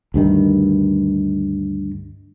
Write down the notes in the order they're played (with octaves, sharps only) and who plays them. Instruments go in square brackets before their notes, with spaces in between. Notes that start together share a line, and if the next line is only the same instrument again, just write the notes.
[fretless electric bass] D2 G2 D#3